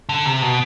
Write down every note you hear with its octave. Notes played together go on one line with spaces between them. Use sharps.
D3
C3
B2